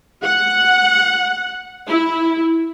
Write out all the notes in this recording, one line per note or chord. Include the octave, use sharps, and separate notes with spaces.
F#5
E4